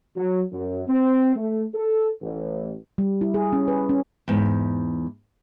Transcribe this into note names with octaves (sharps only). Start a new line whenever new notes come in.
F#3
F#2
C4
A3
A4
A1
G3
E4
G#4
C#4
B4
C#4
E2 G#2